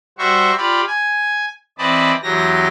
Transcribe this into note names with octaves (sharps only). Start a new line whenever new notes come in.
G3 F#4 C5 E5 C#6
F4 G4 D5 B5
G#5
E3 C4 D5 D#5 A5 B5
E2 F#3 G4 A#6